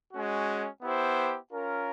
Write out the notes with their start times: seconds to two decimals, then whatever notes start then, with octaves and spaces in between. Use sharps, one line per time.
0.13 G#3 C#4 F#4
0.83 B3 E4 G4 C5
1.52 C#4 F4 A#4